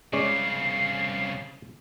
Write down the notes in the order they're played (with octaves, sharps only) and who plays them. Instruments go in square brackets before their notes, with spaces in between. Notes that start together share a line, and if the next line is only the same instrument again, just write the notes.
[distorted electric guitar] C2 C#3 [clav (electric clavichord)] G#3 C#4 D5 [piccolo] C7